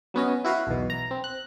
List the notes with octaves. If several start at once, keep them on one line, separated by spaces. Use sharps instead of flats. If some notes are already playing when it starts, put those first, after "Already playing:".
F#3 B3 C#4 D#5
E4 F#4 B4 F5
B1 E2 B2
A#5
C4
F#6